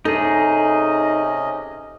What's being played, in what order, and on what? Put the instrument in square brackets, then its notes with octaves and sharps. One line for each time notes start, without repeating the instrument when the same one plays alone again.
[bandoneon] C3 C#4 D#5 [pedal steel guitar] D#4 G#4 [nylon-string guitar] A4